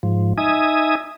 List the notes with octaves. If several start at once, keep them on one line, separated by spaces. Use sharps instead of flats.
G#2 F3
D#4 E5 G#5 D#6